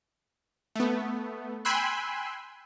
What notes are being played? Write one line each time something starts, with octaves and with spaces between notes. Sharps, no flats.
A3 B3
G5 G#5 B5 C6 E6 F#6